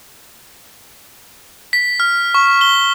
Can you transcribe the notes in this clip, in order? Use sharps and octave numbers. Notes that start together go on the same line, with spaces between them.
B6
F6
C#6
G7